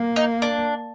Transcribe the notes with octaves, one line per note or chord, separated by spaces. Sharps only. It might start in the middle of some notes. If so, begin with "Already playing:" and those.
Already playing: A#3
D#4
D4